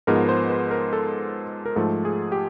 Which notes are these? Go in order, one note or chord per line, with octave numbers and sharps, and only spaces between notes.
G#2 F3 G#3 B3 A#4
C5
B4
A#4
A4
A#4
G#2 F3 A3 A4
G#4
G4